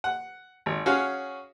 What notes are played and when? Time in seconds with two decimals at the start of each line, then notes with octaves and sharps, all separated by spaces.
0.04 F#5
0.66 G#1
0.86 C#4 F#4 G#4 C#5 F5